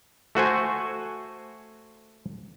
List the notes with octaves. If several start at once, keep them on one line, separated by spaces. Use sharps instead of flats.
A3 F#4 C5 G#5